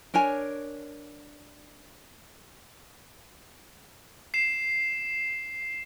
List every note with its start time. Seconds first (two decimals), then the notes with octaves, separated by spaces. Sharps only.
0.14 D4 A#4 C#5 G#5
4.34 C7 E7